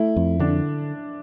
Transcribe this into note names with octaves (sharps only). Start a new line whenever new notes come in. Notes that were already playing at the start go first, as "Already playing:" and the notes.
Already playing: A3 E4
F2
D3 D4